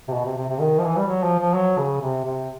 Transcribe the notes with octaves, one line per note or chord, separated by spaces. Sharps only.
C3
B2
C3
C3
C3
D#3
F3
E3
G3
F#3
F3
F3
F#3
C#3
C3
C3